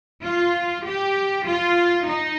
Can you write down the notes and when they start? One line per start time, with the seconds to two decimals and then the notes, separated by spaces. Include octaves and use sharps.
0.25 F4
0.86 G4
1.47 F4
2.07 D#4